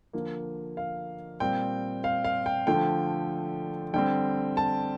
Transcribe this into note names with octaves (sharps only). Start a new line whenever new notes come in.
D3 F3 A#3
F5
A#2 G3 C4 G5
F5
F5
G5
D3 F3 A3 G5
D3 G3 C4 G5
A5